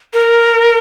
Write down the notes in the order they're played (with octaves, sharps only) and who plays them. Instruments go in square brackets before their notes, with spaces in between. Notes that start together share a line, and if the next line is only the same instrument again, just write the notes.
[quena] A#4